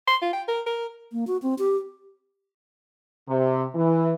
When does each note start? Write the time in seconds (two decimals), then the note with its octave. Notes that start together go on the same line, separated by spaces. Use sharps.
0.08 C6
0.22 F4
0.33 G5
0.48 A#4
0.66 A#4
1.12 A#3
1.27 F#4
1.42 C4
1.59 G4
3.28 C3
3.75 E3